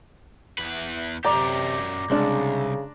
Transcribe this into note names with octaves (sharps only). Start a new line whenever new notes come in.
E2 B4
F#2 C3 G4 D5 A#5
C2 C#3 G#3 D4